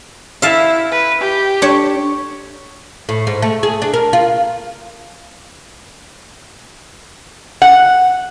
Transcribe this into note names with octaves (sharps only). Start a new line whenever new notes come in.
E4 E5 F5 A5
B4
G4
D4 C#5
A2
G#2
A3
G#4
D4
A#4
F4
F#5